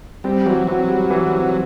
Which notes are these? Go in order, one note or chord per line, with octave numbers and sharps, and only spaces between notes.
G3 C4
E3 F#3
F#3 C4
G3
E3
C4